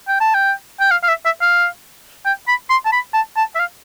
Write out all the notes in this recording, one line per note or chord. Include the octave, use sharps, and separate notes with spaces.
G5
A5
G5
G5
F5
F5
E5
E5
F5
G5
B5
C6
A5
B5
A5
A5
E5
F5